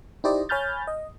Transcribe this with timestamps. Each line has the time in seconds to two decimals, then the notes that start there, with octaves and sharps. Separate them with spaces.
0.24 D#4 E4 G4 C5 D5 D#5
0.49 C#5 G#5 B5 F6 G6 A6
0.87 D#5